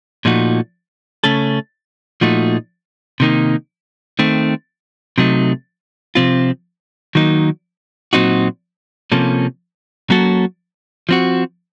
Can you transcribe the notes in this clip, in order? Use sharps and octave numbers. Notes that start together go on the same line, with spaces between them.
A#2 F3 A3 D#4 F#4
C#3 A3 C#4 A4
A#2 F3 A3 D#4 F#4
C3 D#3 A#3 D#4
D#3 A3 C4
C3 F#3 A3 D#4
C3 F3 C4 F4
D#3 F#3 A#3 D#4
A#2 F#3 C4 D#4 F#4
C3 F3 A#3 C#4 A4
F#3 A#3 C#4 F#4 A4
F3 C4 F#4